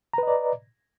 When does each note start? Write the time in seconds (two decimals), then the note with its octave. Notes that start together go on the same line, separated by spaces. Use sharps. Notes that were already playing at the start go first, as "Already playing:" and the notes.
0.14 A#5
0.18 B4
0.23 D#5
0.28 D5